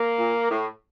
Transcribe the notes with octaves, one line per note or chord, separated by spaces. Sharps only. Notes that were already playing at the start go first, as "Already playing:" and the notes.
Already playing: A#3
A#2
A2